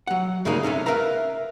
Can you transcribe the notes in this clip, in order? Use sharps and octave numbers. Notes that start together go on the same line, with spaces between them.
F#3 F#5
G2 C#3 G#3 A#3 D#4 G#4
C3 A3 C#4 D#4
A#4 B4 E5 F5 A#5